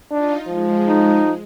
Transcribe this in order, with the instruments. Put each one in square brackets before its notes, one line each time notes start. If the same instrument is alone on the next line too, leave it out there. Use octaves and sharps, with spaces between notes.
[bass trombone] D4 [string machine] D#4 F4
[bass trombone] F3 [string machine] G#3
[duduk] D#4